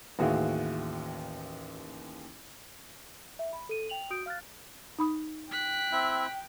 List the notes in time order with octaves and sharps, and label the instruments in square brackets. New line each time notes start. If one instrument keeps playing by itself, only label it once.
[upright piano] A1 D#2 F#4 G#4 E5 F5
[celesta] E5
B5
A4 D#7
G5 F7 F#7
F#4 D#6 G6 D7
F5 F6 F#6 A6
[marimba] D#4 B5 D#6
[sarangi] G5 [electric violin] F#6 B6
[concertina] C4 E4 E5